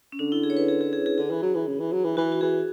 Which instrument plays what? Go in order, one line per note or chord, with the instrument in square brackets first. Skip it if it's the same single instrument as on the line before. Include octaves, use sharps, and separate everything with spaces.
[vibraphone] C#4
[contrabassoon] D3 [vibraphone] D4
[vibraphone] E4
G#4
C#5
B4
G#4
G#4
G#4
G#4
[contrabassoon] D3 [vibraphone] G#4
[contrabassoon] E3
F#3
E3
C#3
E3
F#3
E3
[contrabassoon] E3 [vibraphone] F#4
[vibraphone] F#4
[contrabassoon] E3 [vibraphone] G#4